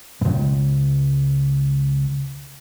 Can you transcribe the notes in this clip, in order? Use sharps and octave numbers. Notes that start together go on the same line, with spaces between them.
C#2 G2